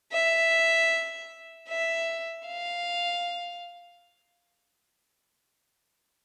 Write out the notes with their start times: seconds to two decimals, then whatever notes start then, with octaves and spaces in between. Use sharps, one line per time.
0.13 E5
1.69 E5
2.47 F5